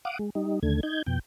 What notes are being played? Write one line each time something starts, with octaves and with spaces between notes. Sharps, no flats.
F5 F#5 D6 D#6
G#3
G3 D#4
D#2 D3 A3 G#6
D#4 G6 G#6
F2 B2 G5